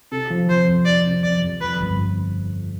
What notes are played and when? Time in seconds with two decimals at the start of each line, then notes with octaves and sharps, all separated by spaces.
0.11 C3 A4
0.30 F3
0.49 F3 C5
0.68 F2
0.86 C4 D5
1.05 C3
1.23 F3 D5
1.42 F2
1.61 F3 B4
1.80 G1